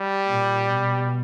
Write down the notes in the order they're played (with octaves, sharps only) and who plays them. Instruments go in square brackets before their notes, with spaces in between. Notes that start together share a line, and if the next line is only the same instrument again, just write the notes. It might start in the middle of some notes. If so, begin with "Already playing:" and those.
Already playing: [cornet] G3
[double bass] A#2
B2